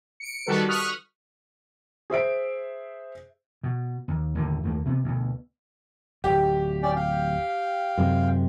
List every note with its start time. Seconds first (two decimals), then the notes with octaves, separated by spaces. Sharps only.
0.20 C#7 D7
0.46 D#3 G3 F#4 A4 B4
0.68 C#6 D#6 F6 F#6 B6
2.10 G#4 C5 E5 D7
3.63 B2
4.08 D#2
4.35 D#2 A2 D3
4.63 D#2 A3 A#3
4.85 C3 A#3 B3
5.04 D2 B2
6.24 D1 G#1 G4
6.83 C#4 D5 G5
6.96 F5 G5
7.97 F#2 C3 G#3